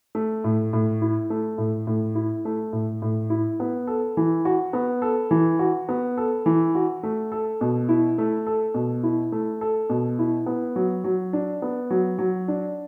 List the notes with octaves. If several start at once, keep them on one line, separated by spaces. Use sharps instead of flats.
A3
A2
A2
E4
A3
A2
A2
E4
A3
A2
A2
E4
B3
A4
E3
F#4
B3
A4
E3
F#4
B3
A4
E3
F#4
A3
A4
B2
E4
A3
A4
B2
E4
A3
A4
B2
E4
B3
F#3
F#3
D4
B3
F#3
F#3
D4